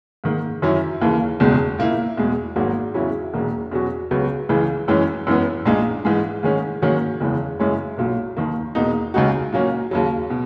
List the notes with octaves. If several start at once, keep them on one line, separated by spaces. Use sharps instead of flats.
G#2 D#3 A#3
F#2 D#3 F#3 C#4 E4
D#2 C#3 E3 A#3
F#1 E2 B2 G#3
A#2 A#3 E4
E2 B2 G#3
G#1 G#2 F#3 A#3
E2 C#3 F#3 C#4 E4
E1 E2 B2 A#3
E2 B2 F#3 C#4 F#4
C#2 C#3 F#3 B3 F#4
C#2 C#3 E3 G#3
F#2 E3 G#3 C#4
F#2 E3 G#3 B3
A#1 A#2 G#3 D#4
G#2 E3 G#3
G#2 D#3 G#3 C#4
G#2 D#3 F#3 A#3 C#4
F#1 E2 C#3 E3 G#3
F#2 C#3 G#3 C#4 E4
B1 A#2 F#3
D#2 D#3 A#3
E2 B2 A#3 D#4
C#2 C#3 G#3 D#4 F#4
A#2 F#3 A#3 C#4
D#2 C#3 F#3
B2